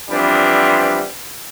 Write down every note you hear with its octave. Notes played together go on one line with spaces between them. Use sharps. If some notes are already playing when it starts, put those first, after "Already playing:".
E3 F3 G3 B3 C4 D4